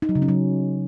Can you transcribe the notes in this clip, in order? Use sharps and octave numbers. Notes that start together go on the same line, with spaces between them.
D#4
F#3
C#3
C#4
F#3